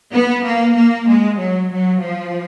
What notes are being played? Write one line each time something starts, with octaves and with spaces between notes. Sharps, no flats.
B3
A#3
A#3
G#3
F#3
F#3
F3